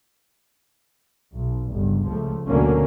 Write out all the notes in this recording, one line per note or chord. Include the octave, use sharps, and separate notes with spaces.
B1
G1 C#2
C#2 F3 A3
D2 B2 D3 F#3 A#3 C#4